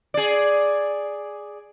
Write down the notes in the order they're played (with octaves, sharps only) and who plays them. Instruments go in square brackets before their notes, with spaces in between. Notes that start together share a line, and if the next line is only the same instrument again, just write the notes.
[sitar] G#4 D5